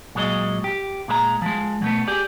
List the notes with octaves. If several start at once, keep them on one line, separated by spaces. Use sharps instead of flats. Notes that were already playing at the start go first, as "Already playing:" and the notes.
A#2 F#3 G#3 C5 D#5
G4
A#2 G#3 B4 A#5
F3 G#3
B2 A3 B3
G4 G#4 D5